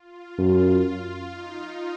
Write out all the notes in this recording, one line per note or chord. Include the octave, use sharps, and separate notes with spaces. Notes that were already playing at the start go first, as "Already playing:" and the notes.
Already playing: F4
F#2
D#4